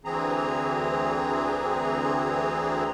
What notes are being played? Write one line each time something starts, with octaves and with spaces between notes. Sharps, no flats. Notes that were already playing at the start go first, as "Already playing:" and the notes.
D2 E3 C4 G#4 A#5